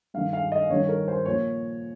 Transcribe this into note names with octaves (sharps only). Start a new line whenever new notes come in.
G2 D#3 F5
F5
D#5
G2 D#3 C#5
A#4
C5
A#2 F3 C#5